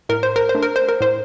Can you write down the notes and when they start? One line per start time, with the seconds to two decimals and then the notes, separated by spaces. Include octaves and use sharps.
0.09 A2 A#4
0.23 C5
0.36 A#4
0.49 C5
0.55 A3 D4
0.63 A#4
0.76 C5
0.89 A#4
1.00 A2 C5